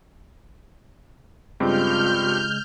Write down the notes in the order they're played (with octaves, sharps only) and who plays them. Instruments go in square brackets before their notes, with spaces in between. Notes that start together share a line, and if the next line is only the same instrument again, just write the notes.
[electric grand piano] G2 C4 G4 [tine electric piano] C#3 G#3 [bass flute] F4 [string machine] F6 G6